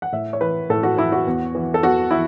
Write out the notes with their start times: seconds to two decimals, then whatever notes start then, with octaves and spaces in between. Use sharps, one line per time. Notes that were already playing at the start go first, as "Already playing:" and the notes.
0.02 F#5
0.12 A2 E5
0.33 C#5
0.41 E3 B4
0.70 A2 A4
0.83 F#4
0.97 E3 E4
1.12 F#4
1.27 E2
1.55 E3
1.74 A4
1.83 E2 F#4
2.11 E3 E4